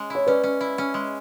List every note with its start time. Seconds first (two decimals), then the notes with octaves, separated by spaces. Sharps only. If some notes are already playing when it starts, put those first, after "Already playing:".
Already playing: G#3 C#4
0.10 E4 C#5
0.27 C#4 B4 D5
0.43 C#4
0.61 E4
0.78 C#4
0.94 G#3